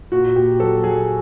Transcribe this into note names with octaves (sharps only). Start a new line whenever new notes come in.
A#2 F#4
A#2 G4
F#3 A4
F#3 G#4